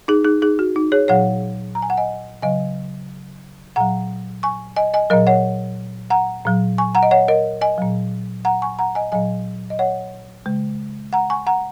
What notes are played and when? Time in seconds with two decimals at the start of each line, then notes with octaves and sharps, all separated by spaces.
0.08 D#4 G#4
0.24 D#4 G#4
0.42 D#4 G#4
0.59 F#4
0.76 D#4
0.92 G#4 C#5
1.08 A#2 F#3 C#5 F#5
1.75 A#5
1.82 G#5
1.90 F#5
1.98 D#5 G#5
2.42 C#3 F#3 D#5 G#5
3.76 A#2 F#3 F#5 A#5
4.43 G#5 C#6
4.76 D#5 G#5
4.94 D#5 G#5
5.10 A#2 F#3 A#4 D#5
5.27 C#5 F#5
6.10 F#5 A#5
6.45 A#2 F#3
6.78 G#5 C#6
6.95 F#5 A#5
7.03 D#5
7.11 C#5 F#5
7.28 A#4 D#5
7.61 D#5 G#5
7.78 A#2 F#3
8.45 F#5 A#5
8.62 G#5 C#6
8.79 F#5 A#5
8.95 D#5 G#5
9.12 A#2 F#3 D#5 G#5
9.70 D#5
9.79 C#5 F#5
10.46 C#3 G#3
11.13 F#5 A#5
11.30 G#5 C#6
11.47 F#5 A#5